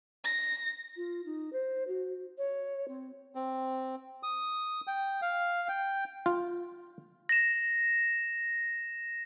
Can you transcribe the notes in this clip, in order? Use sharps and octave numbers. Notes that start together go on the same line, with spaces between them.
A#6
F4
D#4
C5
F#4
C#5
C4
C4
D#6
G5
F5
G5
F4
A#6 E7